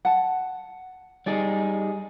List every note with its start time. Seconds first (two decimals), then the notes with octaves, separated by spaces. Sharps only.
0.05 F#5 A5
1.26 G3 D#4 G#4 D5